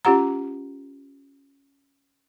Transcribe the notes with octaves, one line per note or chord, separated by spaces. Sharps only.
C#4 F4 G4 F#5 A#5